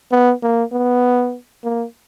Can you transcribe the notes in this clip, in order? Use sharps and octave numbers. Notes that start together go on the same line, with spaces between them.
B3
A#3
B3
A#3